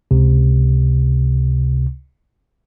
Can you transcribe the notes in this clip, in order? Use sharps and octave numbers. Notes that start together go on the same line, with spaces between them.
C#2 C3